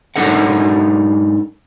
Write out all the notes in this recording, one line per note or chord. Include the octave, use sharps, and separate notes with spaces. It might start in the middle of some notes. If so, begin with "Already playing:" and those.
G#2 D4 A4 A#4 F#5